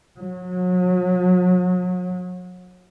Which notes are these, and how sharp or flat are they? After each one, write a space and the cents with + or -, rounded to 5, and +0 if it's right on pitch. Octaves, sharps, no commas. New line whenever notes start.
F#3 -35